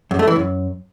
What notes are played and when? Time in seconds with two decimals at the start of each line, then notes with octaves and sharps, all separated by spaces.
0.11 F#2
0.19 A3
0.28 E3
0.36 F#2